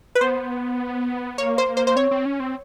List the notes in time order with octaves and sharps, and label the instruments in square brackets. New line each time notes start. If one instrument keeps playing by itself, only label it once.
[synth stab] B4
[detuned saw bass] B3 [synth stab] C5
[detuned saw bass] A#3 [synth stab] C#5
[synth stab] C5
C5
C5
[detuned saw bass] C4 [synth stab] C#5
[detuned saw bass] C4
C#4
C4